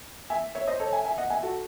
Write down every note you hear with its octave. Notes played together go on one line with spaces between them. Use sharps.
E5 G#5
C#5 E5
C5 D#5
A4 C#5
E5 G#5
E5 G#5
D#5 F#5
E5 G#5
F#4 A4